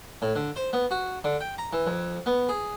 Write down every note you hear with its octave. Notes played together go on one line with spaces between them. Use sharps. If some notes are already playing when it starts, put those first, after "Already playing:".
A2
D3
C5
B3
F#4
D3
G5
A#5
E3
F2
B3
G#4